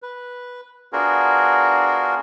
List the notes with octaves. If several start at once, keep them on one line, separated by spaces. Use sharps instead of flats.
B4
B3 D4 F4 F#4 G#4 A#4